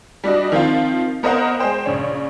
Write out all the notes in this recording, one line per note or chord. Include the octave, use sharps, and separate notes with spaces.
G3 D4 F#4 D#5
D#3 F3 C4 F4
B3 A#4 C5 D#5 F5 F#5
G#3 G#4 C5 G5
A#1 C#3 C#5